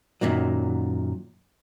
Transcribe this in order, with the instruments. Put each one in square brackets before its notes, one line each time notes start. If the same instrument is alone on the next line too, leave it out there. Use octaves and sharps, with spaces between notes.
[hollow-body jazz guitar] F#2 A#2 D#3 F#3